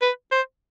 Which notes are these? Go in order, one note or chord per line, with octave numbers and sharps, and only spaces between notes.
B4
C5